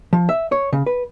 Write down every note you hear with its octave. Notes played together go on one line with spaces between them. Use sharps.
F3
E5
C#5
C#3
B4